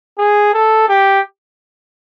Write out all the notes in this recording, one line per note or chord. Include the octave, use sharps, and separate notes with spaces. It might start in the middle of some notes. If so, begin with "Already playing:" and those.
G#4
A4
G4